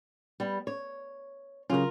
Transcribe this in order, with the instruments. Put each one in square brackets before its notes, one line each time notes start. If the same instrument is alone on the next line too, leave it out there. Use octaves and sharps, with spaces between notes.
[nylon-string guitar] G3 B3
C#5
[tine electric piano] C#3 F#3 C#4 [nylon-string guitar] F4 A#4